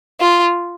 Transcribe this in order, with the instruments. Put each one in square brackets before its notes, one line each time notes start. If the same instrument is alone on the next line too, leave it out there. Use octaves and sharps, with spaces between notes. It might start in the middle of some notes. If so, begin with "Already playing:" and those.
[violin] F4